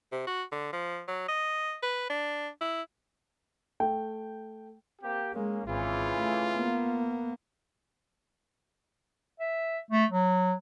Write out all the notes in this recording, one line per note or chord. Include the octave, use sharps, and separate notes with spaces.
C3
F#4
D3
F3
F#3
D#5
B4
D4
E4
A3 G5
A#3 C4 G4
G#3 A#3 C#4
G#1 C#3 E3 F4
A3
A#3 B3
E5
A3
F#3